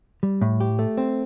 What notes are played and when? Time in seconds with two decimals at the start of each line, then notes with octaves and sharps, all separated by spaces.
0.23 G3
0.41 A2
0.60 G4
0.79 A3
0.97 C4